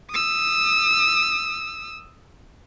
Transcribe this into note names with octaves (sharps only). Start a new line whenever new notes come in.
D#6 E6